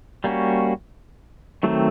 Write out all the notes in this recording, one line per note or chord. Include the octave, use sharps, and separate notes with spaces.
G3 A#3 C#4 F#4
D#3 F#3 A3 C4